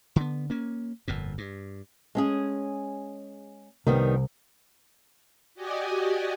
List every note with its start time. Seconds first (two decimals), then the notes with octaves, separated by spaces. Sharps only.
0.16 D3 B3
0.50 A#3 C#4
1.08 G1 F2 A#2
1.38 G2
2.15 G#3 C#4 G#4
3.87 C2 D#3 G3 B3
5.54 F#4 G4 D5 D#5 G#5